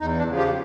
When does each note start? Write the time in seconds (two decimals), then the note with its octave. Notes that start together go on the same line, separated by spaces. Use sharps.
0.01 E2 D#4
0.19 D4
0.28 C#3 F3
0.38 F4 G4